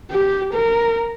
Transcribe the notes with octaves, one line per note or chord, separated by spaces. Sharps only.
G4
A#4